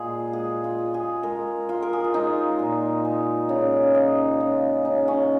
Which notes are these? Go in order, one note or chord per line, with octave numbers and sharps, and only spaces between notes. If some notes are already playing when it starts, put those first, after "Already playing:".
Already playing: A#2 G#3 F4 G#4
G#3 G#4
F4
G#3
G#4
G#3 A#4
G#3 F4
A#4
G#4
F4
G#3 D#4
A#2
G#3
C#3
C#3 D#4
C#3 F4
C#3 D#4
C#4